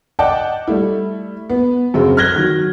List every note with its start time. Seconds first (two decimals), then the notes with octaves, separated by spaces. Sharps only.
0.19 D5 D#5 F#5 G5 A5
0.68 G3 A3 E4
1.50 B3
1.94 F#2 C#3 C4
2.17 F6 F#6 G#6 A#6 G7
2.36 D#3 F#3